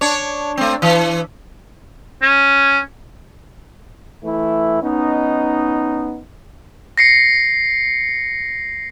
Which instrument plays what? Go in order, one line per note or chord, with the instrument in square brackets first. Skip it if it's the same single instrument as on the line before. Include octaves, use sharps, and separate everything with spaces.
[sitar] D4 C#5
A3 C4
E3
[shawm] C#4
[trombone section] E3 A3 E4
B3 C#4 D#4
[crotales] A#6 C7 C#7